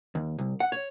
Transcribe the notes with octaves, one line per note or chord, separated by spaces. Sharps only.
D#2
C2
F#5
C#5